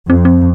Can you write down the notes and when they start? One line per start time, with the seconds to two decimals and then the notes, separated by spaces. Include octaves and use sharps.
0.09 F2 C4
0.25 C4